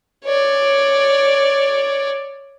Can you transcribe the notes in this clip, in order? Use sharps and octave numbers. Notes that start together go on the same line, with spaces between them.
C#5 D5